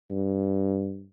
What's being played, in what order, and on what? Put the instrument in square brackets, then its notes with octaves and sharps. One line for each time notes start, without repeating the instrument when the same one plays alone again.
[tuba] G2